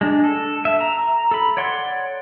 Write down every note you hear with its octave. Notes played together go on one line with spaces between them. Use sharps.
G#3 D4
A4
E5
A#5
A4 B5
C#5 D5 F#5 C6